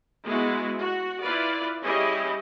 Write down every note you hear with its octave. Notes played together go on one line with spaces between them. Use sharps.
G#3 B3 E4 F#4
F#4
E4 F4 B4 D5
G3 C#4 E4 G4 G#4 D#5